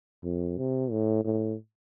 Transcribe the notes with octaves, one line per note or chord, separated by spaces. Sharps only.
F2
C3
A2
A2